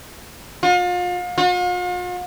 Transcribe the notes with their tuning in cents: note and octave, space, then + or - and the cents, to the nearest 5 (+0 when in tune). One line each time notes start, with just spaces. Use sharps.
F4 +35
F4 +45